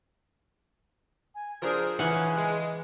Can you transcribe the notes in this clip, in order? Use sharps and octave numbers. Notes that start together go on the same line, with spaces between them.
G#5
F3 D4 G#4 A#4 C5
C#3 E3 F#5 G#5
G#3